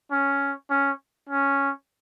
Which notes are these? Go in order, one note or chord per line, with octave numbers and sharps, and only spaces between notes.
C#4
C#4
C#4